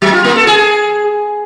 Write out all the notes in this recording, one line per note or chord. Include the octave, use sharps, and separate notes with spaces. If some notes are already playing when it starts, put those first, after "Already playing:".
F#3
F4
A#3
A4
G#4